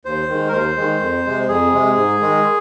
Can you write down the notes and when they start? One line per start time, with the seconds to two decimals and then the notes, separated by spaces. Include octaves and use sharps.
0.05 D#2 C5
0.29 D#3 G#3
0.48 A#4
0.52 D#2 C5
0.77 D#3 G#3
1.01 F2
1.25 C3 G#3
1.48 F2 G#4
1.73 C3 G#3
1.97 G#2
2.21 D#3 G#3